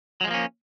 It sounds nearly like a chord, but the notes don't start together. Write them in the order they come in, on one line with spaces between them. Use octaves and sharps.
F#3 G#3 F3 A#3 C#4